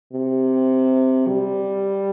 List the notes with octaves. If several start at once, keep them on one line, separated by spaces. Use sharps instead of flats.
C3
G3